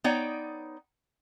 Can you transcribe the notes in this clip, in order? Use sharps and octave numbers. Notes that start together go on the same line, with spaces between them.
B3 D#4 C#5 D5 G5